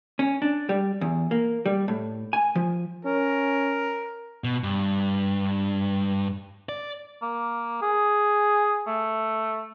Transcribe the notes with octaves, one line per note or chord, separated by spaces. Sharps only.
C#4
D4
G3
E2
A#3
G3
A2
G#5
F3
C#4 A#4
B2
G2
D5
A#3
G#4
A3